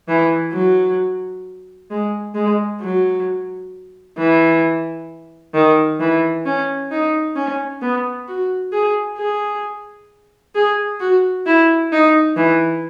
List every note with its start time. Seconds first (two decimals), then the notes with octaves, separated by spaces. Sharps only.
0.08 E3
0.53 F#3
1.90 G#3
2.35 G#3
2.81 F#3
4.18 E3
5.54 D#3
6.00 E3
6.46 C#4
6.91 D#4
7.36 C#4
7.82 B3
8.28 F#4
8.72 G#4
9.18 G#4
10.55 G#4
11.00 F#4
11.46 E4
11.92 D#4
12.37 E3